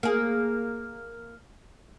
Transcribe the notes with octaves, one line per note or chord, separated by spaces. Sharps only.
A#3 G#4